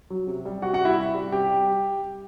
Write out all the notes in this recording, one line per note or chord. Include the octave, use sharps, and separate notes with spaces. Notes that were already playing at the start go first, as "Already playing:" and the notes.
F#3
C3
G3
C3 F#4 F#5
F#4 F#5
G3 E4 E5
C3
G3
C3 G4
G3